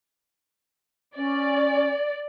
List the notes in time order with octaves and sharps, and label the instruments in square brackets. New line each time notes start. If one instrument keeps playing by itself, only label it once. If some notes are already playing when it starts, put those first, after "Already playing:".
[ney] C#4 [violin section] D5